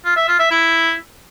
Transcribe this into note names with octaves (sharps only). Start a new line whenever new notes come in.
F4
E5
F4
E5
E4